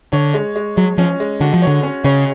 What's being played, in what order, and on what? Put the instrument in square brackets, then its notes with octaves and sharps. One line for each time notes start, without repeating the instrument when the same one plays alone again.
[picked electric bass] D3 [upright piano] C#5
[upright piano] G#3
G#3
[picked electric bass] F#3 [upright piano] G#3
[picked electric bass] F3 [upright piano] C#4
[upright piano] G#3
[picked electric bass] D3 [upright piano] F#4
[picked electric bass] F3
[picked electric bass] D3 [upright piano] C#5
[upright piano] C#4
[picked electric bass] C#3 [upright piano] C#5